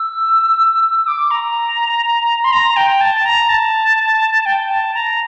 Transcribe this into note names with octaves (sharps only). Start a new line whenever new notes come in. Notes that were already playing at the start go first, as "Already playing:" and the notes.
Already playing: E6
D6
A#5
C6
A#5
G5
A5
A#5
A5
G5
A5
A#5